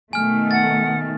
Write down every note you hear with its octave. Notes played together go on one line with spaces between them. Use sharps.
B2 D#3 A3 G#5 F6
F#5 A6